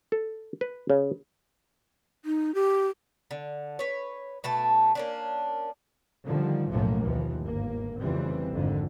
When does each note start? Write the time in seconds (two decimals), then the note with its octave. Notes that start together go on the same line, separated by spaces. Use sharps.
0.12 A4
0.61 B4
0.90 C#3
2.25 D#4
2.55 G4
3.31 D3
3.79 B4 C#5
4.44 B2 A3 A5
4.95 A#3 C#4 D4
6.26 D3 D#3 F3 G3
6.71 B1 F#2 A2 F3 A3 A#3
7.03 D#2 B2 E3 F3
7.42 G1 G#2 A#3
8.00 F1 F2 C#3 E3 G3 C4
8.53 G#1 F2 D3